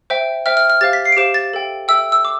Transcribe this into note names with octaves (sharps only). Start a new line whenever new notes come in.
C5 E5 G5
C5 E5 G5 F6
F6
F6
G4 C5 F5 A6
B6
C7
D7
G4 C5 F5 E7
A6
A4 E5 G5
A4 E5 G5 E6
E6
D6